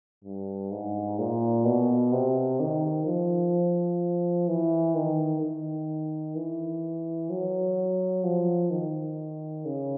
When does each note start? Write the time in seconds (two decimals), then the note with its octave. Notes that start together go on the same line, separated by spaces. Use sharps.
0.24 G2
0.71 G#2
1.18 A#2
1.65 B2
2.12 C3
2.60 D#3
3.06 F3
4.48 E3
4.95 D#3
5.41 D#3
6.35 E3
7.30 F#3
8.24 F3
8.70 D#3
9.65 C#3